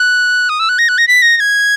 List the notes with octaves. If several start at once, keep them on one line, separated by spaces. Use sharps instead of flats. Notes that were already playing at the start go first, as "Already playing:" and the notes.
Already playing: F#6
D#6
E6
F#6
A#6
F#6
A#6
B6
A#6
A#6
G#6